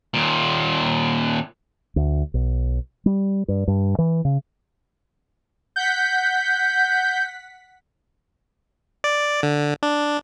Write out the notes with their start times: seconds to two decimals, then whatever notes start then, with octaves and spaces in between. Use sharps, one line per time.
0.14 D#2 A#2
1.96 D2
2.34 B1
3.06 G3
3.48 G2
3.68 G2
3.99 E3
4.25 C#3
5.76 F#5 G6 B6
9.04 D5
9.43 D3
9.83 D4